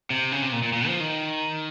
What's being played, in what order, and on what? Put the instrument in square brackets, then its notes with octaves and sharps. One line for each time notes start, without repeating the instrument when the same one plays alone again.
[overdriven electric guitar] C3
C#3
C3
A#2
A#2
A#2
F3
D#3